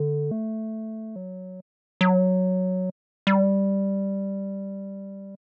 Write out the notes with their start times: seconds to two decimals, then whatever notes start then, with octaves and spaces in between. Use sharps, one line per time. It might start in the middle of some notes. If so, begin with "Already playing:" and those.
Already playing: D3
0.31 A3
1.16 F#3
2.01 F#3
3.27 G3